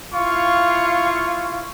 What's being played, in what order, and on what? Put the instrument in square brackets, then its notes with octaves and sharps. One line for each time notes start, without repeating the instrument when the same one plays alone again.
[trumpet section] E4 F4 F5 C#6